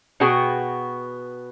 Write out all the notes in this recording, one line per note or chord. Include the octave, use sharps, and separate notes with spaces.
B2 B3 F#4 G#4 G5